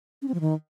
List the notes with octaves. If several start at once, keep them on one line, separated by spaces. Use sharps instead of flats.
C#4
C4
F3
D#3